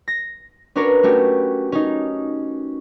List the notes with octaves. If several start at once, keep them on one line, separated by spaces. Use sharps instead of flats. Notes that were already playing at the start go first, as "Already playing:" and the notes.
A#6
C#4 D4 F#4 A#4 B4 C#5
A3 C#4 F#4 G4
C#4 D#4